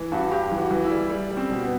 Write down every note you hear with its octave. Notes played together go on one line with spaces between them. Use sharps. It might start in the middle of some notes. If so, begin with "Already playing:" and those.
Already playing: E3
G2 F#4
G2 G4
E3
F#4
E3
E4
G3
G3
G3
C4
B2
B3